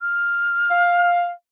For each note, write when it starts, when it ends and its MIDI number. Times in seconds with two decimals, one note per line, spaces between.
0.01 1.14 89
0.69 1.29 77